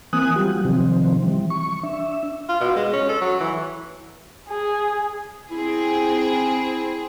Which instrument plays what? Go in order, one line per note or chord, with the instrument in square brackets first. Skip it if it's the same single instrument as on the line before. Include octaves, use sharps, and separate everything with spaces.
[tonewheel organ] E3 A#3 C4 G#5 D#6 F#6
F#3 G3 F4 G4
C3 D#3 F3 C4
E3 G3
C#6
D4 E5
[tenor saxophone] F4
B2
G#3
C#4
A4
F#3
E3
[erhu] G#4
[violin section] C4 G#4 [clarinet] E4